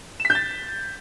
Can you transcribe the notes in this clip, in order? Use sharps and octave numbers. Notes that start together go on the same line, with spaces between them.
E7
B6
G6
A6